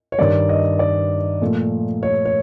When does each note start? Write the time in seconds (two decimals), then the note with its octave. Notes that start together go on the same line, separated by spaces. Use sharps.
0.12 C#5
0.18 G2 D#3 G3 D5
0.49 D#5
0.79 D5
1.42 A#2 F3 A3
2.03 C#5
2.25 C#5